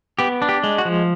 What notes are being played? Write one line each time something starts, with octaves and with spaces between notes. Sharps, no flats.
B3 G4
D4
G4
G#3
F#4
F3